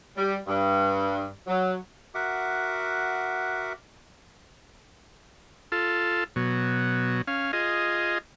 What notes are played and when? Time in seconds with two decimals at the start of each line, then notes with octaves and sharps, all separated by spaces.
0.16 G3
0.46 G2
1.47 F#3
2.15 F#4 A#4 E5 F#5 D6
5.72 F4 A4
6.36 B2 F#3
7.27 C#4 F5
7.53 F4 G#4 D#5